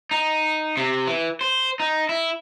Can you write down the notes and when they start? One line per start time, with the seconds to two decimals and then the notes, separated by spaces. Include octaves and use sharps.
0.11 D#4
0.77 C3
1.07 E3
1.41 C5
1.80 D#4
2.09 E4